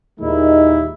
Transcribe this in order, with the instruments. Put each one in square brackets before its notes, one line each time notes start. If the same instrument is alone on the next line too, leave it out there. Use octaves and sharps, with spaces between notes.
[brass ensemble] D#2 A#2 D#3 G#3 D#4 E4